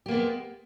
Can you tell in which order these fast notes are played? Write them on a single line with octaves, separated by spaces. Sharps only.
G4 A#3 B3 G#3